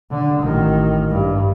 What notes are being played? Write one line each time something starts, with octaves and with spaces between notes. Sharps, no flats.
D3
A1 D#3
G2